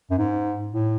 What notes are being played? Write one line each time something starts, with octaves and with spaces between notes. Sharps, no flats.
F#2
G#2
A2